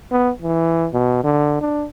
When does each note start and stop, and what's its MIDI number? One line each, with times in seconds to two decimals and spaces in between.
0.11 0.31 59
0.42 0.88 52
0.93 1.22 47
1.24 1.57 50
1.61 1.85 62